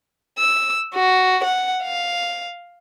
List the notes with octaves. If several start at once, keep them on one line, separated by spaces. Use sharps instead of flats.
E6
F#4
F#5
F5